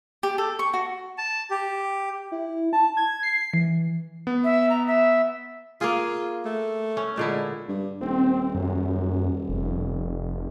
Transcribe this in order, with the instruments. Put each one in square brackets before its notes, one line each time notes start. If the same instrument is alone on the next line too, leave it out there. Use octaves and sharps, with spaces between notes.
[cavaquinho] G4
A4
C#6
F#4
[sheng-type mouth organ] A5
G4
[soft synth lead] E4
A5
G#6
C7
E3
[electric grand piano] B3
[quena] E5
A#5
E5
[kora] A#3 G#4 [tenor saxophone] F4
[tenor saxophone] A3
[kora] C#4
[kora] A#2 D3 E4 [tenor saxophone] G#3
[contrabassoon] G2
[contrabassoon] D#1 [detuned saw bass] C4
[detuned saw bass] F#2
F1